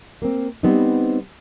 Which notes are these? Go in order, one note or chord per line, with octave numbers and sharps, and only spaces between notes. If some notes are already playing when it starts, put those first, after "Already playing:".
A#3 C4
G3 B3 C4 D#4